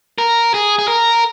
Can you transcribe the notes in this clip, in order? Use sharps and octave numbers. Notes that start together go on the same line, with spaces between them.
A#4
G#4
G#4
A#4